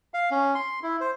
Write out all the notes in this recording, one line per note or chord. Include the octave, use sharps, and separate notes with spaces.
F5
C#4
C6
E4
C5